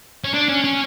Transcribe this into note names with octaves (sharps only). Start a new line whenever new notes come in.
C#4
D4
C#4
C#4